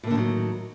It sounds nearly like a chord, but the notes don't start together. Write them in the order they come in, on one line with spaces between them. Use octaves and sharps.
A2 A#3 D3 D#3 F#3